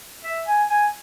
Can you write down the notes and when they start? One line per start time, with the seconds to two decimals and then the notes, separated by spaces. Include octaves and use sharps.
0.24 E5
0.47 G#5
0.70 G#5